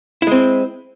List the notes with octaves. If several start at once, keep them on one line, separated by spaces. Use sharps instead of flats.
G#3 C4 E4